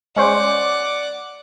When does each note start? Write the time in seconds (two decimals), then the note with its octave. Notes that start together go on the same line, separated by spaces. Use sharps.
0.16 G#3 C#4 C5 D5 F#5 D6